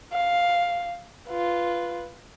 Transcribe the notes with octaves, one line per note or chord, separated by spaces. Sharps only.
F5
F4 B4